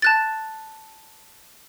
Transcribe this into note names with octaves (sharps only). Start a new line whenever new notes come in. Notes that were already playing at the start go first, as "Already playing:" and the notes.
A5 F#6 A6